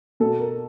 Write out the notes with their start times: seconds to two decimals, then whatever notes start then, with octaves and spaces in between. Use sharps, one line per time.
0.20 B2 A4
0.40 A#4